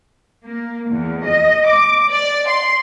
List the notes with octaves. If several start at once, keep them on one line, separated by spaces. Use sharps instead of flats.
A#3
E2
D#5
D6
D5
C6